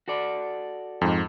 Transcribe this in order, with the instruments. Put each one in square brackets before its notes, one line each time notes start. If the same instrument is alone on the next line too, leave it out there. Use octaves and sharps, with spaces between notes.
[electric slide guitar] F#4 A4 D5
[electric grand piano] F2 G#2